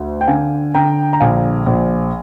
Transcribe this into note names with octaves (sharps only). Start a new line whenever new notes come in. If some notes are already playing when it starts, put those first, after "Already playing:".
Already playing: D2
G5
D3 F5 G#5
D3 G5 A#5
A#5
A#1 F5 G#5
A#1